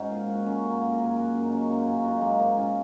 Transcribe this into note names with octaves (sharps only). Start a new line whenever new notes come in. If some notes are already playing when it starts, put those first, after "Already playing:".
Already playing: G#2 C#4 D#4 F#4
A#2 G#4
A#2 F#4
F#3 C#4
F#2 A#3
F#2 A#3
A#4
F#2 G#4
F#3 F#4
F#2
D#4
F#3 C#4
F#2 A#3
A#2 C#4
F#4
A#2 D#4
F#3 G#3 A#3
G#2 A#3
A#2 C#4